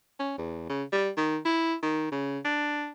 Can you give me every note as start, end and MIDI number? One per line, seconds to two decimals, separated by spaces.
0.19 0.38 61
0.38 0.67 40
0.70 0.84 49
0.93 1.10 55
1.17 1.38 51
1.45 1.75 64
1.83 2.09 51
2.12 2.39 49
2.45 2.90 62